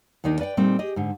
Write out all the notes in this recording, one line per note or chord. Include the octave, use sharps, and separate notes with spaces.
D#2 D#3 D4 D#4 A#4
B4 D5 F#5 G5
A#2 G3 A3 C4 D#4
G4 G#4 D#5
G#2 D3